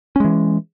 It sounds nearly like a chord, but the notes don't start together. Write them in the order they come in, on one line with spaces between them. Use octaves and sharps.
C#4 G#3 E3